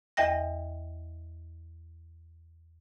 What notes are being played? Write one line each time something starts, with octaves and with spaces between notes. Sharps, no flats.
E2 D#5 E5 G5 A#6